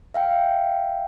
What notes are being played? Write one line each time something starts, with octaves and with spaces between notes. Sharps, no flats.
E5 F5 G5